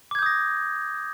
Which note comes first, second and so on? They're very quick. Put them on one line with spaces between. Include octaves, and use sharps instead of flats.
D6 G#6 G6 D#6 A#6